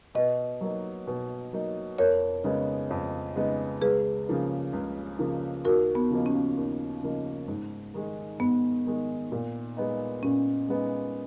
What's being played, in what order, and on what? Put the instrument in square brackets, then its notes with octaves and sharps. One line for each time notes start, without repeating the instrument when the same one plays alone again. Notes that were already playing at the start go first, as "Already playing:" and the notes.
[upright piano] B2 [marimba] B4 D#5
[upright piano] F#3 A#3 D#4
B2
F#3 A#3 D#4
[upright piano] F2 [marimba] A#4 C#5
[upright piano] C#3 G#3 B3 D#4
F2
C#3 G#3 B3 D#4
[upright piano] C#2 [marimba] G#4 B4
[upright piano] C#3 F3 A#3
C#2
C#3 F3 A#3
[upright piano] D#2 [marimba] F#4 A#4
[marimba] B3
[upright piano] C#3 F3 A#3 D#4
[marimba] C#4
[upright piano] D#2
C#3 F3 A#3 D#4
G#2
D#3 G#3
[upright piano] G#2 [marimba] B3
[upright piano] D#3 G#3
A#2
G#3 B3 D#4
[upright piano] A#2 [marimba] C#4
[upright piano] G#3 B3 D#4